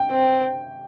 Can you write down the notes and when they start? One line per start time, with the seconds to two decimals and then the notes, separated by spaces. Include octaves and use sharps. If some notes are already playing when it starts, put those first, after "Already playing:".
Already playing: G5
0.11 C4